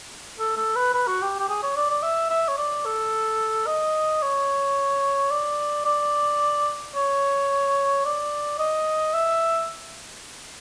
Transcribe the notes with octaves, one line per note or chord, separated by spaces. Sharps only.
A4
A4
B4
B4
F#4
G4
G4
G#4
C#5
D5
D5
E5
E5
C#5
D5
A4
D#5
C#5
D5
D5
C#5
D5
D#5
E5